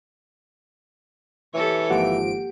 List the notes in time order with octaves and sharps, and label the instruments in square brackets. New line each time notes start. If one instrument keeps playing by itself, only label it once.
[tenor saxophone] E3 [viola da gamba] G4 A4 C#5
[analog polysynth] G#1 F3 D7 [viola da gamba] A#3 [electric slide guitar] G4 F#5